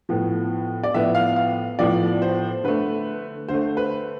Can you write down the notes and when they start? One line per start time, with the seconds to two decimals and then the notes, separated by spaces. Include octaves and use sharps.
0.09 A2 F3 B3
0.83 D5
0.94 A2 F3 B3 E5
1.15 F5
1.36 F5
1.79 A2 F3 B3 D5
2.22 C5
2.64 D3 A3 B4
3.49 D3 A3 C5
3.77 B4